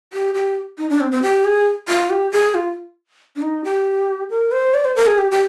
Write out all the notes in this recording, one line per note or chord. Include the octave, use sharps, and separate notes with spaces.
G4
G4
D#4
D4
C4
C4
G4
G#4
F4
G4
G#4
F4
D4
D#4
G4
A#4
C5
D5
C5
A#4
G#4
G4
G4